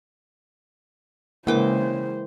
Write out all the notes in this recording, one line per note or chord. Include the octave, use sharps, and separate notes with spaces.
C#3 E3 G#3 A#3 A#4 C5 G5 D6